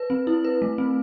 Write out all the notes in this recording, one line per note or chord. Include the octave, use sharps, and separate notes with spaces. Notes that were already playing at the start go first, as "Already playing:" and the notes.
Already playing: B4
C4
E4
B4
A3
C4